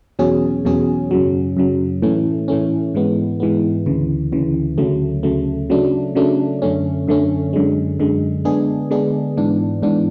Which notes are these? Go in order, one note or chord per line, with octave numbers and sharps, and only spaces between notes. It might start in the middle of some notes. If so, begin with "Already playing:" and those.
E2 B2 F#3 C#4 G#4
E2 B2 F#3 C#4 G#4
F#2 C#3 F#3
F#2 C#3 F#3
A2 E3 A3 C#4
A2 E3 A3 C#4
G#2 E3 G#3 B3
G#2 E3 G#3 B3
D2 C#3 E3
D2 C#3 E3
D2 C#3 F#3 A3
D2 C#3 F#3 A3
C#3 F#3 A3 D4
C#3 F#3 A3 D4
F#2 D3 A3 C#4
F#2 D3 A3 C#4
F#2 D3 G#3
F#2 D3 G#3
D3 G#3 B3 D4 G#4
D3 G#3 B3 D4 G#4
G#2 E3 B3 D4
G#2 E3 B3 D4